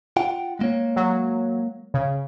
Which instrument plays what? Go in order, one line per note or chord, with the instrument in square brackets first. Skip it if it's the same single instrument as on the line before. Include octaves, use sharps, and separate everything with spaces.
[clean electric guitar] F4 F#5 G5
G#3 A#3 C#5
[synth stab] F#3
C#3